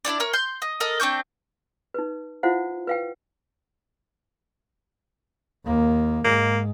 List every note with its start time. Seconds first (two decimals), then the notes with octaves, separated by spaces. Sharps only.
0.05 D4 E4 C#5 D5
0.20 A#4 C#5
0.33 C6 G6
0.62 D#5
0.80 A4 A#4 D#5
1.00 C4 D4 C#6 G6
1.94 D#4 B4
2.43 E4 F4 C5 F5 F#5
2.87 B4 F5 G5
5.65 D#2 A#3
6.25 G#2 G#3 A#3